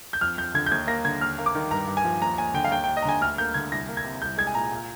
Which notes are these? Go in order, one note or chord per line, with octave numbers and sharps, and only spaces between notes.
G6
F2 F6
F2 G6
D3 G#6
G6
D#2 G#6
A#3 A#6
D3 G#6
D#2 F6
A#3
D6
D#3
G2 A#5
G2
G#5
F3
D#2 A#5
D#2 G#5
D3 G5
F5
D#2 G5
G5
D#2
D#5
A#5
D3 G#5
D2 F6
A#3 G6
D3 G#6
C2 A#6
A#3
G#6
C3
C2 G6
G#3 G#6
G#5
A#2 A#5
A#2